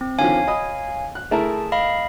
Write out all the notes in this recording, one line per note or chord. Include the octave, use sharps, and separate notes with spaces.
C4
D3 D#3 F3 C#5 F5 G#5
D#5 B5 D#6
F#6
A3 E4 G#4 A#4 A5
D#5 F5 B5